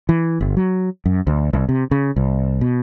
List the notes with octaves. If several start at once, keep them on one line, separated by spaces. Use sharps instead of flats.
E3
G1
F#3
F#2
D2
C2
C3
C#3
C2
B2